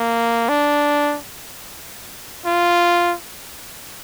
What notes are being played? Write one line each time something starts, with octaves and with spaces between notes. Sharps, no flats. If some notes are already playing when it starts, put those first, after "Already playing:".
Already playing: A#3
D4
F4